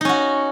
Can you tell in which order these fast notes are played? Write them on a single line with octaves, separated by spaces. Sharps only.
D#4 C#4 F#4